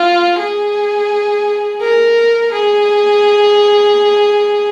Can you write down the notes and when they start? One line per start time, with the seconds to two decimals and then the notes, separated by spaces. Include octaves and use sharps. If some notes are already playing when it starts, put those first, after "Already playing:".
Already playing: F4
0.39 G#4
1.81 A#4
2.52 G#4